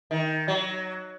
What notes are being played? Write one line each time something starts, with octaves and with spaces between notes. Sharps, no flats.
D#3
F#3